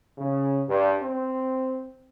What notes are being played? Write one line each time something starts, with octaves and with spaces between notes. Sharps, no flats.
C#3
G2
C4